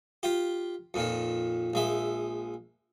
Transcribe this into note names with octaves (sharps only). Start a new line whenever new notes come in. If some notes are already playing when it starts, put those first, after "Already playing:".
F4 G4
F2 A#2 D#3
A#1 G#3 E5